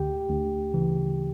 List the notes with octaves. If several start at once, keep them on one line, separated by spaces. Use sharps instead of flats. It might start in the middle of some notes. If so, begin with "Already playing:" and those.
Already playing: D2 D3 G4 G5
D2
C#3 E3